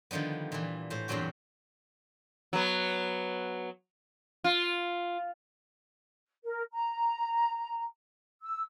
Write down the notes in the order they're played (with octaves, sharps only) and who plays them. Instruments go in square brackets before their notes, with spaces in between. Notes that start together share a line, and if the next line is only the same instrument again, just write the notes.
[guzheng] D3 D#3 F3 G3 B3
A#2 E3
A2 C5
E2 G2 A#2 F#3 C4 F#4
[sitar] F#3 B3
F4
[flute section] A#4
A#5
E6